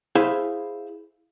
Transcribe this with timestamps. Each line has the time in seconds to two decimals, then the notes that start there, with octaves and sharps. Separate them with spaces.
0.15 E4 G#4 C5 E5 F5